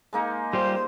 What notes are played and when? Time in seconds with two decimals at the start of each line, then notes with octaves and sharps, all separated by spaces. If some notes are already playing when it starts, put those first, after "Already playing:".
0.13 G#3 A#3 D#4
0.53 G3 F4 G4 C5